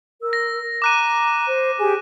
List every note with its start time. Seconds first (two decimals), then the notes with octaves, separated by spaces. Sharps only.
0.21 A#4 E6
0.33 A#6
0.82 A#5 D6 F#6 D#7
1.47 C5
1.79 G4 G#4 G#5